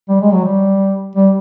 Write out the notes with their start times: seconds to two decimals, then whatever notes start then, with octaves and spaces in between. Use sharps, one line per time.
0.09 G3
0.21 G#3
0.33 F#3
0.45 G3
1.16 G3